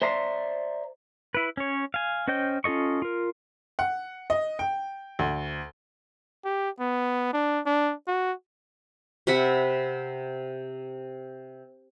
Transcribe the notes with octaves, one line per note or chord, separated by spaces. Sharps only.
C5 D5 E5 A#5 C6
E4 B4
C#4 C#5
F5 G#5
C#4 C5 D#5 G5 G6
C#4 F4 A4 D#5 C#6
F4 A#4
F#5
D#5
G5
D2
G4
B3
D4
D4
F#4
C3 E5 F#5 B5